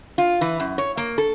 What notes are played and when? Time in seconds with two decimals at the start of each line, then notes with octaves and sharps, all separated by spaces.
0.18 F4
0.41 E3
0.60 F#2
0.78 C#5
0.97 A#3
1.18 A4